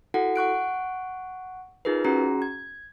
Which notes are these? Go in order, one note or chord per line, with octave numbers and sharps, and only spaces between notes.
E4 F#4 A4 F#5
F#5 C#6 F#6 D7
D#4 F4 G#4 A#4 B4
C#4 F#4 G#4 A#5
G#6